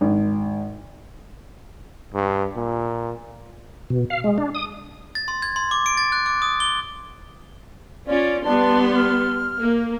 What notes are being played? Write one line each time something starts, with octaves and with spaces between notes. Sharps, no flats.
G#1
G2
A#2
B2
F5
G#3
D4
D#6
A6
C6
G#6
C6
D6
D7
A6
F#6
D6
D#6
G7
C#4 F4 D5
G3 B3 D4 C6
F6
A#3